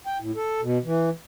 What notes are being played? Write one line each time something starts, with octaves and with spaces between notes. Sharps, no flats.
G5
A2
A4
B2
E3